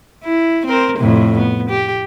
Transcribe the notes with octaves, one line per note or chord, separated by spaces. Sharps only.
E4
C4 A#4 C5
F2 A2 C3
B3
G4